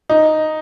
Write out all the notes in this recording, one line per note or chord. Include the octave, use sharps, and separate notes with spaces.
D#4